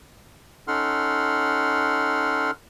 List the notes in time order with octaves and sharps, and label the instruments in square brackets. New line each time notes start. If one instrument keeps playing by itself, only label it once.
[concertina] C#4 D#4 A4 F#5 C6 F6